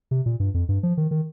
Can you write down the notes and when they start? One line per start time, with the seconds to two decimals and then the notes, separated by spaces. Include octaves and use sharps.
0.11 C3
0.26 A#2
0.40 G2
0.54 F2
0.69 G2
0.83 F3
0.97 D#3
1.11 D#3